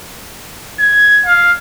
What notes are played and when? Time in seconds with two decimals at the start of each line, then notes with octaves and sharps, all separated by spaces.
0.80 G#6
1.26 F5